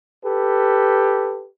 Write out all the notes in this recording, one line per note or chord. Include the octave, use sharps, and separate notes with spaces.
G4 A4 B4